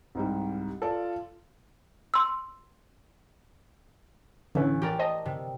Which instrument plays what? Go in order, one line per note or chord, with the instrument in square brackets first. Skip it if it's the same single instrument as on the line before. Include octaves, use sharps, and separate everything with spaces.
[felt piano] C2 G#2 G3
[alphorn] F4 [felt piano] A4 D5
[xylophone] C6 E6
[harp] A1 [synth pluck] D3 E3 C#4
[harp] G4 A#4 D5
[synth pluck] C5 D#5 A5
[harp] C3